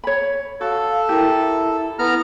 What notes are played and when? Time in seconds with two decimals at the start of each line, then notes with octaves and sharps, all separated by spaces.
0.04 C#5 B5
0.61 F#4 A4 F5
1.09 E4 G4 A#4
1.99 B3 A#5 F6